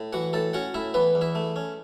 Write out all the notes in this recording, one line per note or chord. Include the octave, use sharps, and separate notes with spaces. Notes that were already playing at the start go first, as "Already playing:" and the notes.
Already playing: A2
E3 F#4 F#5
A2 A4 A5
C#4 F#4 F#5
A2 E4 E5
E3 B3 B4
E2
E4 E5
A3
C#4